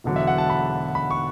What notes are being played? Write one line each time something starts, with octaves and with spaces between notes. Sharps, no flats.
E1 E2 D3 F#3
E5
F#5
A5
B5
B5
C#6